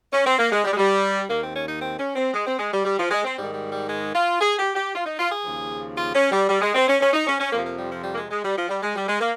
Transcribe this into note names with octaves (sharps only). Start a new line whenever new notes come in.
C#4
C4
A#3
G#3
G3
G#3
G3
D#2 D#3 A#3
C4
C#4
D#4
C4
C#4
C4
G#3
C4
G#3
G3
G3
F3
G#3
C4
G#2 D#3 G3
G3
G3
G#3
F4
G#4
G4
G4
F4
D#4
F4
G#4
D#2 C#3 F3
F4
C#4
G3
G3
G#3
C4
C#4
C#4
D#4
C#4
C#4
F2 C3 F3 A#3
A#3
G3
F3
G3
A#3
G#3
G#3
G3
F3
G3
G#3
G3
G#3
A#3